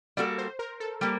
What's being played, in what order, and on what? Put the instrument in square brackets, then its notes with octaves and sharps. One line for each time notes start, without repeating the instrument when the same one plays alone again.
[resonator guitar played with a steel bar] G3 A#3 F#4 A4 [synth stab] D5
[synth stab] C5
A#4
A4
[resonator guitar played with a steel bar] G3 A#3 [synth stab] G4